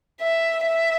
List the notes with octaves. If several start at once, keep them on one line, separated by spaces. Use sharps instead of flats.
E5
E5